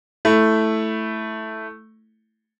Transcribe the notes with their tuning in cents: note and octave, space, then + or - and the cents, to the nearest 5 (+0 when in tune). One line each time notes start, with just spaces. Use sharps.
A3 +0 E4 +0